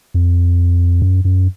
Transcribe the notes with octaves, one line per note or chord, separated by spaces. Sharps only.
F2
F#2
F#2